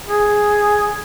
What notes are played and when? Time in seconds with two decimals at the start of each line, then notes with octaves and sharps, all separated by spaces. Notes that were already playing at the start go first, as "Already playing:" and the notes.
0.06 G#4